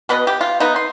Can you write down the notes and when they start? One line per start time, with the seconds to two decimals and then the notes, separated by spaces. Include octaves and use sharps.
0.09 B2 B3 B4 D#5
0.27 G4
0.41 F4
0.60 B3 D#4
0.76 C6